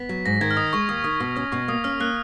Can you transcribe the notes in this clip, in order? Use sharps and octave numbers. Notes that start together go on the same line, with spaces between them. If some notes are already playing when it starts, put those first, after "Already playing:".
Already playing: B3 B6
F#3
G#2 A#6
D#3 G#6
F6
D#4 D#6
G#3 C#6
D#2 D#6
D#3 D#6
B2 C#6
C#4 D#6
B2 C#6
A#3 D#6
C#4 F6
A#3 F#6